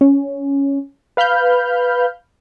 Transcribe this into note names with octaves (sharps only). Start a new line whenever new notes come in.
C#4
B4 F5 B5 F6 G6